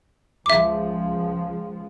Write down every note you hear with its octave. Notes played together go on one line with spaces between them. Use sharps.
C#2 F3 G#3 E5 D6